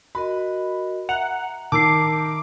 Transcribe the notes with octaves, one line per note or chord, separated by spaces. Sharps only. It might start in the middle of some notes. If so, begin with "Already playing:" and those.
F#4 A#4 D#5 B5
E5 F#5 A#5 F7
D#3 A5 D6 E6 C7